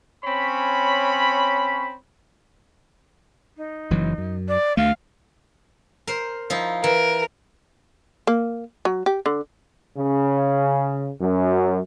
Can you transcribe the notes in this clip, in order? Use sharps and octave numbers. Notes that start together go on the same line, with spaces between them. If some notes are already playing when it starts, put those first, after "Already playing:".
C4 C#4 C#5 B5
D#4
F#1 E3 F#3
F#2
D5
D2 A3 F5
A#4 C5
F3 D#4 E4
E3 A#4
A#3
F#3
G4
D3
C#3
F#2